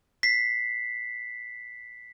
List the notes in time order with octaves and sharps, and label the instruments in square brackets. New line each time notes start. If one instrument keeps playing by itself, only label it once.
[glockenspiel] B6 C7